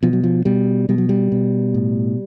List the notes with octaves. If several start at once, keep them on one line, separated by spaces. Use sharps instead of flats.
B2 F3
F#3
F3
B2 G3
B2 G3
F#3
G3
B2
A2